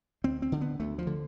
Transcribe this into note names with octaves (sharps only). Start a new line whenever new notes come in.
D2 C4
C4
D3
B3
D2 A3
F3
D3